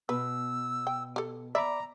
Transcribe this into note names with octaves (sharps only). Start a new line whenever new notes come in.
B2 B4 E6
G5
G4 A4
D5 E5 A#5 B5 D6